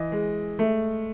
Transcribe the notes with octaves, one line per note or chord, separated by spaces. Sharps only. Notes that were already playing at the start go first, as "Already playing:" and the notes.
Already playing: E3 D#5
G#3
A3